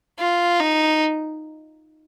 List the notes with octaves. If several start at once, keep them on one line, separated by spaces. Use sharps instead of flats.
F4
D#4